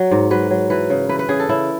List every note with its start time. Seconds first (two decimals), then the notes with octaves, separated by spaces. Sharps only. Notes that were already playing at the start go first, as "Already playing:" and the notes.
Already playing: F#3
0.11 G#2
0.30 F#3 B4
0.50 F#3
0.70 E3 B4
0.90 C#3
1.09 E3 B4
1.19 B4
1.29 C#3 G#4
1.39 A4
1.49 C#3 E4